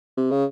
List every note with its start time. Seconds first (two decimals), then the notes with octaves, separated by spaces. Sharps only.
0.17 C3
0.31 C#3